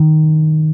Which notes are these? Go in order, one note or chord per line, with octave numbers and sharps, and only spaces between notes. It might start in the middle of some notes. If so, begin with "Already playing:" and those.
Already playing: D#3